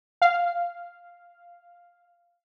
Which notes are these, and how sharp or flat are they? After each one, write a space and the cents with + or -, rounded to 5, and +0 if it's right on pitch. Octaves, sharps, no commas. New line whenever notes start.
F5 -5